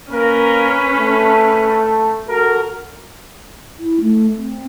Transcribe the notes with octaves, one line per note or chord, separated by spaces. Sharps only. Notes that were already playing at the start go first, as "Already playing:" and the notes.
A#3 C#4 A#4 B4
A3
F#4 A4 A#4
E4
A3
C4